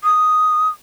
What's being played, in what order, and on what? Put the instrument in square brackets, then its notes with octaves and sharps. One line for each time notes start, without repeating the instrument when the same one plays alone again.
[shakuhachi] D#6